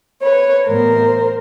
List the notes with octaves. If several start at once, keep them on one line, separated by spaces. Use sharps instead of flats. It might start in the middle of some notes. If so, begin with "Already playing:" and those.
B4 C#5
A2 E3 G3 B3 A#4 C5